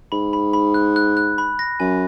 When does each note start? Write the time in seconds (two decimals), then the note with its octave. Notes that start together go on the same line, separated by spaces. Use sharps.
0.12 G#2 B5
0.33 B5
0.53 B5
0.74 F#6
0.96 F#6
1.17 F#6
1.38 B5
1.59 A#6
1.80 F#2 G#5